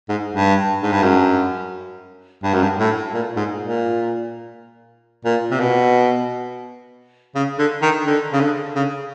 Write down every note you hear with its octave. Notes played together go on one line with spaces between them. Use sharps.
G#2
G2
G#2
G2
F#2
G2
F#2
G2
A2
A#2
G#2
A#2
A#2
C3
B2
C#3
D3
D#3
D3
C#3
D3
C#3